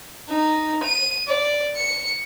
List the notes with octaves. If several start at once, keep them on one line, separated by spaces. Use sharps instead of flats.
D#4
D#7
D5
C#7